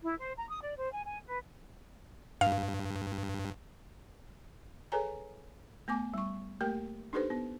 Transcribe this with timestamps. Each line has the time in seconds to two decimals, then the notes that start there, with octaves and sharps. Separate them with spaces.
0.03 E4
0.18 C5
0.37 A#5
0.50 D#6
0.62 D5
0.76 C5
0.92 G#5
1.05 G#5
1.26 B4
2.41 G2 F5
4.92 G#4 A4 B4 C#5 G#5 A#5
5.88 A3 B3 G#5 D6
6.14 G3 C#6
6.61 A3 A#3 G4 A#4 G5
7.13 D4 D#4 G4 A4 B4 C5
7.30 B3